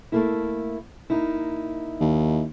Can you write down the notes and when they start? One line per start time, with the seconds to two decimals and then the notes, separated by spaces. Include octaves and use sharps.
0.12 A3 A#3 E4
1.10 A#3 D#4 E4
2.00 D#2